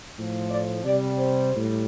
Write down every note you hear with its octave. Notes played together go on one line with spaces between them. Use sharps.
A2 F3
D5
C3 G3 D5
C5
A2 G3